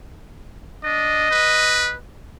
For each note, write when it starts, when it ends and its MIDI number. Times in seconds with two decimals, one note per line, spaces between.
0.84 1.29 62
0.84 1.97 75
1.30 1.96 71